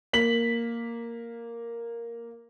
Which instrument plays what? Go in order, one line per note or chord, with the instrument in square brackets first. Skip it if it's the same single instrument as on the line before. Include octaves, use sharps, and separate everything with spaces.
[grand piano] A#3 B6 F#7